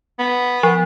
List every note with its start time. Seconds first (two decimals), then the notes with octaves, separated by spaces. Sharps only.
0.19 B3
0.63 F3